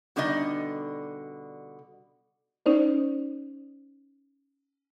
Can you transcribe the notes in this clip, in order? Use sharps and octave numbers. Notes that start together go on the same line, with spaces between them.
B2 D3 G3 D#4 D5 D#5
C#4 D#4 C5 D5